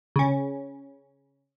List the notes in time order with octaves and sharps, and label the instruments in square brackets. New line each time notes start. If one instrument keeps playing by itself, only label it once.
[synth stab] C#3 C#4